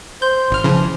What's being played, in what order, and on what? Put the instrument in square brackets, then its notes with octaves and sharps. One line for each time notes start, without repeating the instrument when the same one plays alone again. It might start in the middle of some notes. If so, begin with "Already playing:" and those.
[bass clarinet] C5 [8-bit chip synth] G6
[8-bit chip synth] G#1 F6
[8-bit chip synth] C#3 E3 [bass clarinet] F3